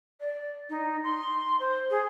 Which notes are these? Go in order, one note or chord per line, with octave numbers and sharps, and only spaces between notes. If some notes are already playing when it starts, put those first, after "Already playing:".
D5
D#4
C6
C5
G#4